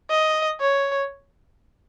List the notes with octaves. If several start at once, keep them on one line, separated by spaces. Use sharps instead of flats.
D#5
C#5